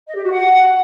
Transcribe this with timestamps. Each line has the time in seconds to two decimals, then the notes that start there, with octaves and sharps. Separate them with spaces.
0.07 D#5
0.15 G4
0.23 F#4
0.31 F#5